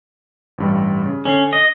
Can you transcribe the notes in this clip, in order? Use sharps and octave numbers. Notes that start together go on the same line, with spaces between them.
A1 G2 G3
C#3
D3 C#4 C7
D#5